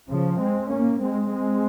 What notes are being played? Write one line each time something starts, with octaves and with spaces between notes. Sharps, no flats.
C#3 F3
G#3 C4
A#3 C#4
G#3 C4
G#3 C4